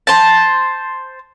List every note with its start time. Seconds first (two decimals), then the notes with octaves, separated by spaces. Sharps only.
0.07 C5 A5